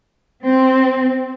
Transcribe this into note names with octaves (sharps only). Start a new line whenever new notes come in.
C4